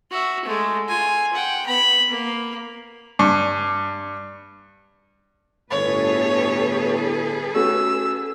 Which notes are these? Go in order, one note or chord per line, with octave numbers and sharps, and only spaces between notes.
F#4 E5
G#3 A3
F4 G#5
F#5 G5
B3 B5
A#3
G2
G1 A2 G#4 A4 B4 C#5
A3 C#4 F#4 E6